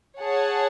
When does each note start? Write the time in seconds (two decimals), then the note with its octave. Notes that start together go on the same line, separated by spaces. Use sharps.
0.21 G#4 C#5 F#5 A5